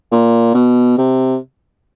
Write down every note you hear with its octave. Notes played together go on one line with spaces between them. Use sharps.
A#2
B2
C3